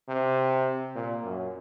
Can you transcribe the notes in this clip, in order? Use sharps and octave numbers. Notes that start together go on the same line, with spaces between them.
C3
A#2
F#2